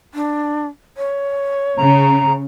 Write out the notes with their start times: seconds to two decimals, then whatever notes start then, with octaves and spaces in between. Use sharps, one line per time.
0.14 D4
0.97 C#5
1.77 C#3 A#5